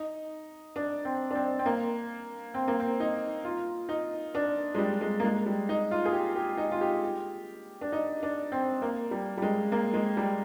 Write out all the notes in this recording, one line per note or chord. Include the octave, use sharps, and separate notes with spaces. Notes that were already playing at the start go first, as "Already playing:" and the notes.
Already playing: D#4
D4
C4
D4
C4
C4
A#3
C4
A#3
C4
D#4
F4
D#4
D4
G#3
G3
G#3
A#3
G#3
G3
D#4
F4
G#4
G4
G4
D#4
F4
G4
D4
D#4
D4
C4
A#3
G3
G3
G#3
A#3
G#3
G3